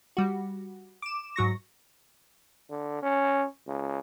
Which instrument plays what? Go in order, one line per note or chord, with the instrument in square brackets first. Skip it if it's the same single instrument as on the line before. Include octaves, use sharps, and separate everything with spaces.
[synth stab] G3 F#4
D6 E7
G#2 F#3 C#6 A#6
[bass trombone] D3
C#4
C#2